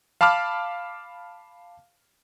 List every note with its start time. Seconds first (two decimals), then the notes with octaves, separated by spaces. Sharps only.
0.21 F5 A5 B5 D6 F6